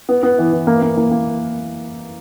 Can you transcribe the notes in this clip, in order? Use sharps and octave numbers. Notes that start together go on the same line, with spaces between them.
B3
B3
E3
E3
A#3
A#3
A#3
A#3